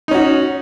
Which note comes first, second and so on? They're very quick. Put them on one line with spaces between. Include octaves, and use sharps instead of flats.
D#4 C#4 F#4